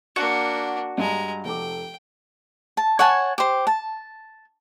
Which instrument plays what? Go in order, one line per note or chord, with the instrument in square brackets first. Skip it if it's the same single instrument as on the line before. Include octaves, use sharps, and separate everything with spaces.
[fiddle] A#3 D4 [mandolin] F#4
[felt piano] G2 A5 [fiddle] G#3 A#5
[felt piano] F1 A4 D6 [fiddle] G5
[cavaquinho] A5
C#5 F#5 G#5 A5
G4 C5
A5